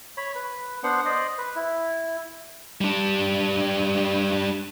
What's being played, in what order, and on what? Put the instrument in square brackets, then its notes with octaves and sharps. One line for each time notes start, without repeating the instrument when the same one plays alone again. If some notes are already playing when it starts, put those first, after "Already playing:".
[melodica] C#5 B5
B4
B3 D4 C5 F#5
C5 D5 D#5
B4
E4
[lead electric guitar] G3 D4